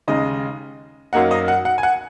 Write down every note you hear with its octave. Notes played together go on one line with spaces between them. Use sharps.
D#2 C#3 G#3 D#4 D#5
F#2 F#3 A#3 D#4 F#5
D#5
F#5
F#5
G#5
F#5